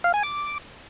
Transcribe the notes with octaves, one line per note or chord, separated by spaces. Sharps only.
F5
G#5
D6